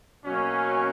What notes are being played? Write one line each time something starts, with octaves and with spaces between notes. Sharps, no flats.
B2 F#3 A#3 C#4